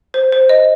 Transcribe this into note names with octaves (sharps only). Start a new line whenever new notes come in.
C5
C5
D#5